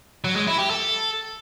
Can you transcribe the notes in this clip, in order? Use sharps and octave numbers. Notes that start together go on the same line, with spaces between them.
F#3
G#3
E4
G4
A4